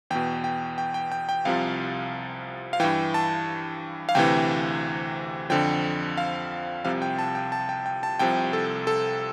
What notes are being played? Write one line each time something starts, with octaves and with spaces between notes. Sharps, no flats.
E2 B2 G5
G5
G5
G5
G5
G5
C2 C3 F3 F5
F5
G2 E3 G5
A5
F5
D2 C3 E3 G5
F2 D3 F3 G5
F5
C2 C3 F3 F5
G5
A5
G5
A5
G5
G5
A5
C2 C3 F3 G5
A4
A4